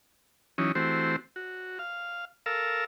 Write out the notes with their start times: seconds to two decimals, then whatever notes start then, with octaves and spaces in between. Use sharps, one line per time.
0.58 E3 F#3 C#4 D#4
0.75 E3 A3 C4 F#4 G4 C5
1.36 F#4
1.79 F5
2.46 A4 A#4 F5 E6